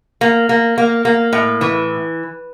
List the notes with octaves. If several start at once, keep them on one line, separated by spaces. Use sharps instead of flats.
A#3
A#3
A#3
A#3
A2
E3